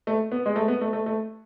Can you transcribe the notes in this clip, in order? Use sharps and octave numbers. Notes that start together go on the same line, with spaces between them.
A3
B3
G#3
A3
B3
A3
A3
A3